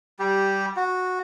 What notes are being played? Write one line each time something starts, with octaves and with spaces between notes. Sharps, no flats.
G3 G4
F#4